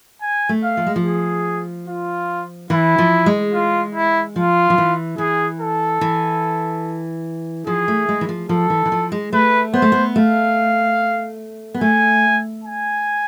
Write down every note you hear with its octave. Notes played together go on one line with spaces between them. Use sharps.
G#5
A3
F5
F3
G#3
F3
G#4
F4
E3 E4
F3
G#3
F4
E4
F3 F4
F3
E3
E3 G#4
A4
E3
F3 G#4
A3
G#3
E3
F3
F3 A4
E3
E3
F3
G#3
A3 B4
B3 C5
A3
B3
A3 F5
B3
A3 G#5
G#5